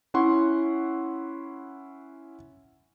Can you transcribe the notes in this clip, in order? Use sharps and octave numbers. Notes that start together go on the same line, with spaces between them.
C#4 E4 F#5 C6 C#6